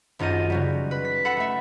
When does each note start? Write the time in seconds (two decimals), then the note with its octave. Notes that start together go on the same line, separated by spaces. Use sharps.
0.19 G#1 F#2 F4 D#5 D#7
0.50 C#3 F#3 G3
0.91 B4
1.05 B6
1.25 A4 F#5 B5
1.37 A3 E5